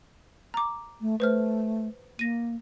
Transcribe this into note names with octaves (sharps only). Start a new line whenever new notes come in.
A#5 D6
A3
A3 B4 C5 F6
A#3 A#6 D#7